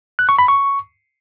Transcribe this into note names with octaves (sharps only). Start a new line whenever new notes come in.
F#6
C#6
B5
C#6